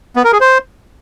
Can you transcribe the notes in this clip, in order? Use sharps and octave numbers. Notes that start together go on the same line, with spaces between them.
B3
A#4
G#4
C5